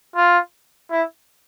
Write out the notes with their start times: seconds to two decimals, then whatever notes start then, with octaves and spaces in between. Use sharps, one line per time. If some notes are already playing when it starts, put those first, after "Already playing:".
0.15 F4
0.91 E4